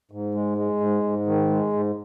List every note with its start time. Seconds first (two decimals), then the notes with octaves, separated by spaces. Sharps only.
0.11 G#2
0.34 G#3
0.58 G#3
0.80 G#2
1.03 G#2
1.26 D#3
1.50 G#3
1.73 G#2